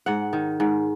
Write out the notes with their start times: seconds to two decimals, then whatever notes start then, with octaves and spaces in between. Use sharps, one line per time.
0.06 G#2 F#5
0.33 D#3
0.60 G#2